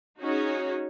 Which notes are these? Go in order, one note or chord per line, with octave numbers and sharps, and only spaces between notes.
C#4 D#4 F#4 G#4 C#5